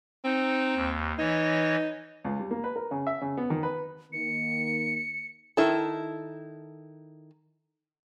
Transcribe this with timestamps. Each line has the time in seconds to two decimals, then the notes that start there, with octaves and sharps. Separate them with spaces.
0.25 C4 D#4
0.76 D#2
1.19 E3 D#4 C#5 A#6
2.24 C#2
2.39 G3
2.51 A#3
2.64 B4
2.76 A#4
2.91 C#3
3.07 E5
3.21 C#3
3.37 B3
3.50 D#3
3.63 B4
4.13 D#3 A#3 C#7
5.57 D#3 E4 A4